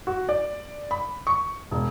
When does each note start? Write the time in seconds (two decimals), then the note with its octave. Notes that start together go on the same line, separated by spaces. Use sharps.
0.07 F#4
0.29 D5
0.91 B5
1.27 C#6
1.71 E1